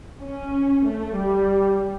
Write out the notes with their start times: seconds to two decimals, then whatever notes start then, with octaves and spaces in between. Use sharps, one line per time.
0.21 C#4
0.85 A3
1.16 G3